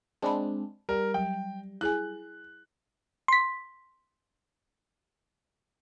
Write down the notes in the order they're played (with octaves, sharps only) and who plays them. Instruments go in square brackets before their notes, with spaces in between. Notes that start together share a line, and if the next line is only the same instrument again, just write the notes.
[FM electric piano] G#3 C4 D4 [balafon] A5 B5
[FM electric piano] G3 [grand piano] A#4
[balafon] F#3 [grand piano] G5
[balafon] E4 G#4 G#5 [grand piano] F#6
[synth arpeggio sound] C6 B6